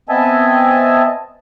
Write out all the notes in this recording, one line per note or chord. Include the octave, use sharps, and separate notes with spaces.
B3 C4 D#5 E5 G#5 A5